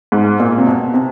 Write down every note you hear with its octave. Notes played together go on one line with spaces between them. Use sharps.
G#2
A#2
C3
B2
C3